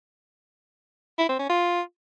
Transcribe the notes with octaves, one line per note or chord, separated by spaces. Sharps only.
E4
C4
C#4
F4